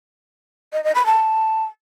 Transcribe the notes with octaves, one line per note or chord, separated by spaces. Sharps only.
D#5
D#5
B5
A5